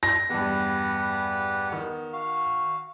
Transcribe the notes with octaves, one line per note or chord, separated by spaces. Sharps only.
A#6
E2 G2 G4 B4 F#5
D#3 B3
F#4 F5